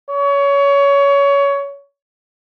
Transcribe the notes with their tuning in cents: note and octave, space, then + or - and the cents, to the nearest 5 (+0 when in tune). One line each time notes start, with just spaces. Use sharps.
C#5 +20